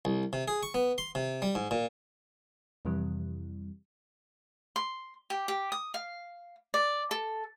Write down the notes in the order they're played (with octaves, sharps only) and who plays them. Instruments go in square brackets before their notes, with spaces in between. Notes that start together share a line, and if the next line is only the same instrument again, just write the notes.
[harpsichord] C2
C3
G#4
C#6
B3
C6
C3
G3
G#2
A#2
[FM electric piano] F2 C3 E3 G3
[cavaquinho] C6
G4
G4
D#6
F5
D5
A4